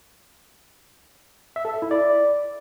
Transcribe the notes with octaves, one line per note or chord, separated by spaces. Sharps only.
E5
A4
E5
E4
D5